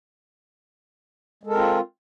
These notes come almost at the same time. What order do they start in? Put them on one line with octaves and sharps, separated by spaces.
G#3 A4 A#4 C4 F4